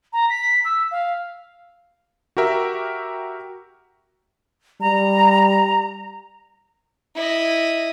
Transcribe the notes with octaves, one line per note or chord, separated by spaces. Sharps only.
A#5
B6
E6
F5
F#4 G4 A#4 E5
G3 A#5
E4 D#5